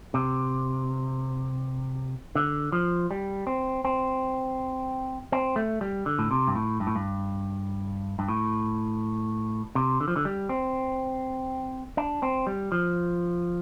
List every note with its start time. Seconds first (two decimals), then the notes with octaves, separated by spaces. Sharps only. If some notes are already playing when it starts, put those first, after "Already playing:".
0.14 C3
2.35 D3
2.72 F3
3.11 G3
3.47 C4
3.85 C4
5.32 C4
5.56 A3
5.81 G3
6.06 D3
6.19 A2
6.31 C3
6.48 G2
6.55 A2
6.80 G2
6.87 A2
6.96 G2
8.19 G2
8.28 A2
9.75 C3
10.01 D3
10.08 F3
10.16 D3
10.25 G3
10.49 C4
11.97 D4
12.23 C4
12.47 G3
12.72 F3